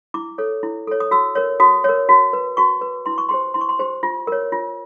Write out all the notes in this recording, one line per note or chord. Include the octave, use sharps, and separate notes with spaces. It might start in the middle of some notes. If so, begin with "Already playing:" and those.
E4 D6
A4 C#5
E4
A4 C#5
D#6
F#4 E6
A#4 C#5
F#4 D#6
A#4 C#5
F#4
B4
F#4 C#6
B4
E4 C6
C#6
G4 C5 C6
E4 C6
C#6
C6
G4 C5
F4
A#4 C#5
F4